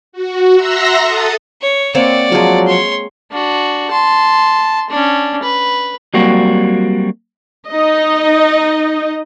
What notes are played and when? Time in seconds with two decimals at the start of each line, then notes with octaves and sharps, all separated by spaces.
0.12 F#4
0.56 E5 F#5 A#5 C6 E6 A#6
1.02 A4 D#6 A6
1.61 C#5
1.95 A#3 C4 C#5 D5 F#5
2.32 F3 F#3 G#3 A#4
2.66 C#5 C6
3.31 D4 F#4
3.91 A5 C6
4.90 C#4 D4
5.43 B4
6.14 F#3 G3 A#3 C4 F#4
7.69 D#4 D#5